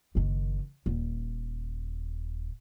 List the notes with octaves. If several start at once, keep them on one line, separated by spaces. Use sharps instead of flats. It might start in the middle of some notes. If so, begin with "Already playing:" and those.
F#1 D#3
D#1